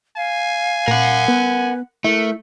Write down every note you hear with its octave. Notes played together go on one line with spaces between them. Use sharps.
F5 G#5
A#2 A#4 F#5
B3 B4
A3 E4 A#4